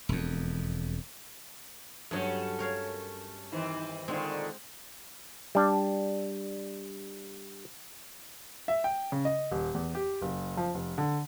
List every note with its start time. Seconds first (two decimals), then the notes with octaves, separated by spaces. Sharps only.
0.09 E1 F2
2.11 G2 F#3 A3 C#4
2.59 A#4 C#5 F5
3.52 D#3 E3 C4
4.08 A#2 D3 D#3 G#3 C4
5.55 G3 D4
8.68 E5
8.84 G5
9.12 C#3
9.25 D#5
9.51 D#1
9.75 E2
9.95 G4
10.22 F#1
10.57 F3
10.74 F1
10.98 D3